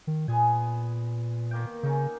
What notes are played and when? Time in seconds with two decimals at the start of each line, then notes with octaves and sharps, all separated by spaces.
0.07 D#3
0.28 A#2 B3 G#4 G#5
1.51 D#3 A#3 G5
1.83 C#3 C#4 D#4